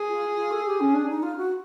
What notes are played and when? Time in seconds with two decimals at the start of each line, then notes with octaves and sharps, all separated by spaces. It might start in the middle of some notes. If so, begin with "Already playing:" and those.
Already playing: G#4
0.08 F4
0.36 F4
0.51 A4
0.65 G4
0.80 C#4
0.94 D4
1.09 D#4
1.22 F4
1.37 F#4